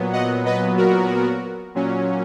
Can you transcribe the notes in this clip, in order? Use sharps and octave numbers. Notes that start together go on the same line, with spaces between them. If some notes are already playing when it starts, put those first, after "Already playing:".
Already playing: A#2 F#3 B3
D#5 F#5
B4 D#5
F#4 A#4
A#2 F#3 C#4